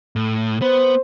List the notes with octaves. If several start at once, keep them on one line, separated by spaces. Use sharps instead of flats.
A2
B3 C5